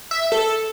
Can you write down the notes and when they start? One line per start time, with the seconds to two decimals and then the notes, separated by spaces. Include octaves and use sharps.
0.11 E5
0.32 A4